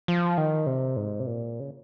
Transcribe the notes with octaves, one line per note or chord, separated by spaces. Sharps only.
F3
D#3
C3
G#2
C3
A#2
C#3